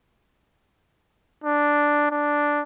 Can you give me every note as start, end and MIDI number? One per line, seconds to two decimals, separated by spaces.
1.44 2.09 62
2.11 2.63 62